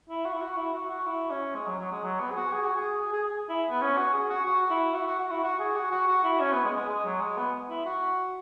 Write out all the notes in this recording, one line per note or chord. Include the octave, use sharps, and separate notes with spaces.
E4
F#4
E4
F#4
E4
F#4
F#4
E4
C#4
G#3
F#3
F#3
G#3
F#3
B3
G#4
F#4
G#4
F#4
G#4
G#4
G#4
G#4
E4
B3
C#4
F#4
G#4
F#4
F#4
E4
F#4
F#4
F#4
E4
F#4
G#4
F#4
F#4
F#4
E4
C#4
B3
G#3
G#3
G#3
F#3
G#3
B3
E4
F#4